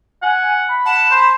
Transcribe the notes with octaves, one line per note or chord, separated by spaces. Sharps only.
F#5 G#5
B5
F#5 A5
C5